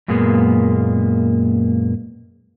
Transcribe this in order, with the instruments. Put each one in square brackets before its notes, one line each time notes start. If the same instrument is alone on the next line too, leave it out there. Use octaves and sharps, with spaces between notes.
[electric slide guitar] F#2 A#2 G#3 A#3 B3